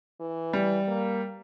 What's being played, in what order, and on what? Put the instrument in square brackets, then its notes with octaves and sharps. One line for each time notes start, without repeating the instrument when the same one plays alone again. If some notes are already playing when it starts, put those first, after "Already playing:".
[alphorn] E3
[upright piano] G3
[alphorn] A#3